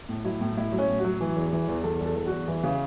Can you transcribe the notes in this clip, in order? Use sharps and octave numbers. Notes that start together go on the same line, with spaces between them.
A2
F#3 E4
A2
A2 E4
F#3
C#4
A2
F#4
F#3
E3
E2
E3
E2
E2 A4
E2 A4
E2
F#4
E2
E3 E4
C#3